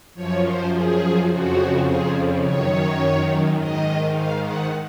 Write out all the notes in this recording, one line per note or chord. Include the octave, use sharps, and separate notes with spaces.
F#2 F3 C#5
C5
G#4
F2 C#3 F3 F#4
G#4
F#2 D#3 C#5
G#2 D#3 D#5
F5
F#5